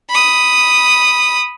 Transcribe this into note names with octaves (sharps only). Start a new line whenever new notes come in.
B5 D#6